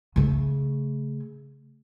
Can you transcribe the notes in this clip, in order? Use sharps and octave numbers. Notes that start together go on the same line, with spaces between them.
C#3 A3